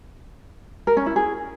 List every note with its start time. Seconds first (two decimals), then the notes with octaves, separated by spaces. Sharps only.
0.87 A#4
0.97 C#4
1.06 E4
1.16 G#4